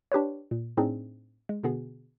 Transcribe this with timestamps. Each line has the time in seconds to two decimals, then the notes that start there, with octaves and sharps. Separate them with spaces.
0.12 D4 G4 B4 C#5
0.51 A#2
0.77 A2 C4 D4 D#4 G#4
1.49 G#3
1.63 B2 D3 B3 F#4 G#4